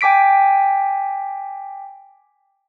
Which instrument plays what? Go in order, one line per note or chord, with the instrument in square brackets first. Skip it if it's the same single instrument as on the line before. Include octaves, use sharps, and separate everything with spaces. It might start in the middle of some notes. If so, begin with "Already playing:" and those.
[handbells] G5 G#5 D6 B6 D7